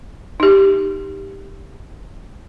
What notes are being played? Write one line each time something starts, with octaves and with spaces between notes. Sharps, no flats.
D#4 G4